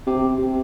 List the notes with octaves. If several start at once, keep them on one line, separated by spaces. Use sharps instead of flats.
C3
C3